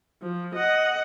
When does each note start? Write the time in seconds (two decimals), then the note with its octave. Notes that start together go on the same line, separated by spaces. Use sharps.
0.22 F3
0.55 D#5 F#5